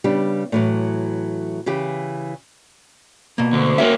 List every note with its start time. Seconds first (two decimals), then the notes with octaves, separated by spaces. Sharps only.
0.04 C#3 G3 B3 D4 G4
0.52 A2 E3 F#3
1.66 C#3 E3 G4
3.38 B2 A#3
3.53 D2
3.78 A#3 C#4 F#4 E5